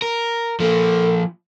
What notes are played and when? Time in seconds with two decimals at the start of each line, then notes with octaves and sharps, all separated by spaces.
0.02 A#4
0.60 F3 A#3 A4